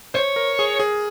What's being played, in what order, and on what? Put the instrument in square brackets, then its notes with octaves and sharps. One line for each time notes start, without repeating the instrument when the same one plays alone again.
[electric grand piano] C5 [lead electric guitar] C#5
[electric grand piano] A#4
G#4
G#4